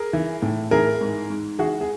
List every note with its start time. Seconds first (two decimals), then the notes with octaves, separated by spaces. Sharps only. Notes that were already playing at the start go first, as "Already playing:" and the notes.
Already playing: G#4 A#4
0.13 E3
0.42 A2
0.71 E3 G#4 A#4
1.01 G#2
1.30 G#2
1.59 E3 F#4 G#4
1.81 G#4